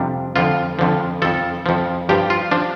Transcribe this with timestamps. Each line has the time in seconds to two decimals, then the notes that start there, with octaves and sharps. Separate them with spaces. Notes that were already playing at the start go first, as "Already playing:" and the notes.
Already playing: F2 C3 G3 D4
0.36 F2 D3 F3 F4
0.79 F2 D3 F3
1.22 F2 F3 A4
1.66 F2 F3
2.09 G2 F3 G4
2.30 F4
2.51 F3 D4